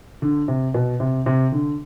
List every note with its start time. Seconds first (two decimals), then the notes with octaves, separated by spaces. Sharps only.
0.22 D3
0.48 C3
0.74 B2
1.00 C3
1.26 C3
1.52 D3